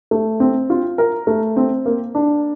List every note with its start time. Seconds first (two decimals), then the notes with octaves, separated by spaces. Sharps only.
0.11 A3
0.40 C4
0.70 F4
0.98 A#4
1.27 A3
1.56 C4
1.86 A#3
2.15 D4